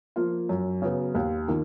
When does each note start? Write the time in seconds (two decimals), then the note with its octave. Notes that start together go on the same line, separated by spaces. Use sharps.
0.16 F3 A#3 F4
0.49 F#2
0.82 C#3 F#3 B3
1.15 D#2
1.48 D#3 A#3 F4